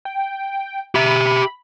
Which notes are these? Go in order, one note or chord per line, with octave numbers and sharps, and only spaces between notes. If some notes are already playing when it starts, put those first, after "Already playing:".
G5
G4 E5 B5